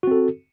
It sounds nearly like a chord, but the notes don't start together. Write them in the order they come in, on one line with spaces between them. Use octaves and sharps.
F#4 C4 A4